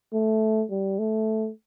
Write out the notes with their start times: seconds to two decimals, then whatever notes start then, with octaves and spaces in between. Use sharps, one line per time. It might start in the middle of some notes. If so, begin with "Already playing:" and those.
0.13 A3
0.71 G3
0.99 A3